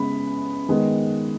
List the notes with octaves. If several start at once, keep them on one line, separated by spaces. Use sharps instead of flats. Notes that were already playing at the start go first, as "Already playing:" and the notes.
Already playing: C#3 G#3 B3 B5
D#3 G#3 B3